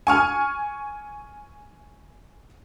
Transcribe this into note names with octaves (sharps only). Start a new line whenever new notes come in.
G#5 C#6 F6